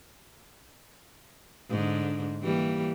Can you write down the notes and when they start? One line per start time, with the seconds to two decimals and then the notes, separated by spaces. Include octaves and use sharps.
1.70 G#2 D3
2.43 E3 G3 A#3